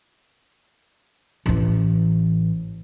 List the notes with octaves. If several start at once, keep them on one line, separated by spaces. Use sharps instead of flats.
A1 E3